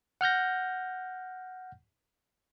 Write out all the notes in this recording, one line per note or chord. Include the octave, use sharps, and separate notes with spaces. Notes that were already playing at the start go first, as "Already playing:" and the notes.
F#5 F6 G6 A#6